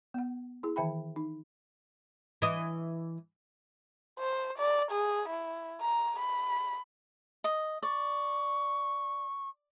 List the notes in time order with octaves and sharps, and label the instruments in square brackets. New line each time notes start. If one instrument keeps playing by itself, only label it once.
[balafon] B3 F#5
E4 G#4
D#3 E3 E5 G5 B5
D#4
[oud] E3 D#5
[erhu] C5
D5
G#4
E4
A#5
B5
[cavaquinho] D#5
[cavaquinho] D5 [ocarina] C#6